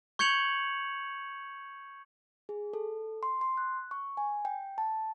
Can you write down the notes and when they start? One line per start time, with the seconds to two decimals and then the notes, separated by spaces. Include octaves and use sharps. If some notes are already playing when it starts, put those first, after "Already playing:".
0.19 C#6 G6 G#6 C#7 F7 F#7
2.49 G#4
2.73 A4
3.23 C6
3.41 C6
3.57 F#6
3.91 C#6
4.17 G#5
4.45 G5
4.78 A5